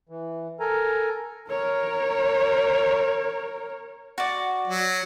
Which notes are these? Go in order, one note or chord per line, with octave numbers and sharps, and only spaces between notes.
E3
A4 A#4 G#5 A#5
A#4 C#5
F#4 D5
F#3